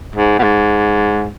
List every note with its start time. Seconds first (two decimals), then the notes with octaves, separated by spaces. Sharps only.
0.16 G#2
0.39 B2
0.43 G#2